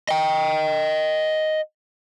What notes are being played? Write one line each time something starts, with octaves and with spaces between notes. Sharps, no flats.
D#5 G5